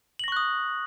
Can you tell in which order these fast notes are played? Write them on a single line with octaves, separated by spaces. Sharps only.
F#7 A#6 C#6 F#6 D#6